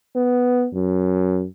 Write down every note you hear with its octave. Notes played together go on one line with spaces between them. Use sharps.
B3
F#2